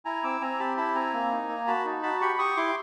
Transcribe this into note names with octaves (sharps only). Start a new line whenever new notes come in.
E4 G#5 A#5
C4 D6 E6
C4 G#5 A#5
G4 A5 B5
E4 A5 B5
C4 G#5 A#5
A#3
D#4
A#3
F#4 A5 B5
D#4
F#4 A5 B5
G4 B5 C#6
G4 C#6 D#6
E4 C6 D6